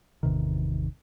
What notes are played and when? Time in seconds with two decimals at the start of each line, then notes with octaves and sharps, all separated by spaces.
0.23 G#1 E2 C3 D#3